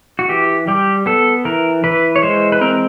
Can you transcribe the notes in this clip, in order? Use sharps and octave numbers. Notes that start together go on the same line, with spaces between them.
F#4
E3 G4
G3 G4
B3 A4
E3 A#4
E3 B4
C#5
G#3 C5
B4
C4 A#4